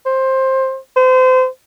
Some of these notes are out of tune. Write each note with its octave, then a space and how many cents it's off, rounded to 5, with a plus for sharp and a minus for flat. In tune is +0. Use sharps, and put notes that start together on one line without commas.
C5 +15
C5 -30